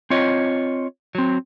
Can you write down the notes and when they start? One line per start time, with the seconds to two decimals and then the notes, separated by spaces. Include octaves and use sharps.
0.10 C4 F4 C#5 D#5
1.15 F#3 C4